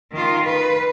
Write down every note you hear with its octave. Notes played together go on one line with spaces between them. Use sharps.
D#3 F4
B4